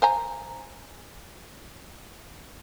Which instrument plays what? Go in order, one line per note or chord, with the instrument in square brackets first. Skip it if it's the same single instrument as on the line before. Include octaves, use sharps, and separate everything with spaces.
[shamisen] C5 G#5 A#5